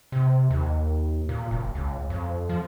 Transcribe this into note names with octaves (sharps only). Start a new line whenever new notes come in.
C3
D#2
A#2
F#1
C#2
F2
F3